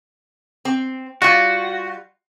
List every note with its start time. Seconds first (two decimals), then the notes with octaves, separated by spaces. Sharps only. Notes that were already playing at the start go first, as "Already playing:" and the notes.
0.65 C4
1.22 G3 F4 F#4